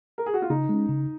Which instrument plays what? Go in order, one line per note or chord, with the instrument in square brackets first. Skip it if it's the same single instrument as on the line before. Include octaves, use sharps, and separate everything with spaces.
[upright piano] A#4
G#4
F#4
F4
[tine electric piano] C#3 [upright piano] D#4
[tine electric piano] G#3 C#4
C#3